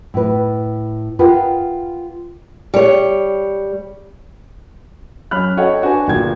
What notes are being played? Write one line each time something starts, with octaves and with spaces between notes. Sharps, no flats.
A2 B4
F4 G#4 A#4 B4 F#5 G5
G3 C#5
F#2 C#4 B5 F6 F#6
F#4 A4 C#5 D#5 F#5 G5
D4 F#4 B4 G#5
G1 A#2 F#4 G5 G#6